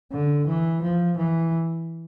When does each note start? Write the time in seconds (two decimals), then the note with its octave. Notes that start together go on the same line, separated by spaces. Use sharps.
0.12 D3
0.47 E3
0.82 F3
1.17 E3